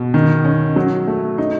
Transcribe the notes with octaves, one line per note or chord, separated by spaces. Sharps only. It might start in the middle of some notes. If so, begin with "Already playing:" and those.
Already playing: B2
D#3
C#4
F#3
A3
D#4